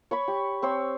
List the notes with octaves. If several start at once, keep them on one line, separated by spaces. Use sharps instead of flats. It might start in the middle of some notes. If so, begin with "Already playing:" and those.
C#5 B5 C#6
G4
C4 C5 C#5 E6